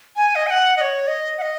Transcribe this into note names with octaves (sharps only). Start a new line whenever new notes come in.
G#5
D#5
G#5
F#5
D#5
C#5
D#5
F#5
D#5